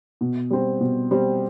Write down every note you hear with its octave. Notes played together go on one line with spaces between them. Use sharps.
B2
G3 C4
B2
G3 C4